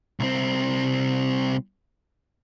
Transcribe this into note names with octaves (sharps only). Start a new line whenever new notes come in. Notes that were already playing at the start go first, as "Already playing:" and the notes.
C2 C4